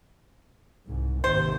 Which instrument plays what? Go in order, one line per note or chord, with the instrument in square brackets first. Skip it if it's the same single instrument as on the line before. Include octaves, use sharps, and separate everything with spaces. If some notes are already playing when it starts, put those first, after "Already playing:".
[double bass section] C2 G#2
[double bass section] G#1 D#2 C3 [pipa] C5